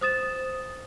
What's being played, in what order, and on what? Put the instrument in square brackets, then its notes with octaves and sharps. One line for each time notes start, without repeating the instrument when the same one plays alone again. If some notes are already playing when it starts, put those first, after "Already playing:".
[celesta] C5 D#6 A6 E7